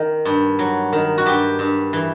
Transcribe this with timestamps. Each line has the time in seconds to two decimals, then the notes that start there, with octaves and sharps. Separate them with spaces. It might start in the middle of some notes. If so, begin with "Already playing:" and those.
Already playing: D#3
0.25 G2
0.59 F#3
0.93 D#3
1.18 F#4
1.26 G2 G4
1.59 G2
1.93 E3